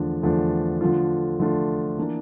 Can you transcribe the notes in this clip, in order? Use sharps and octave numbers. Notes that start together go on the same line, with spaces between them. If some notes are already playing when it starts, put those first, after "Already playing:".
Already playing: E2 D3 F3 A3 D4
E2 D3 F3 A3 D4
D3 F3 A3 D4 F4
D3 F3 A3 D4 F4
E3 A#3 D4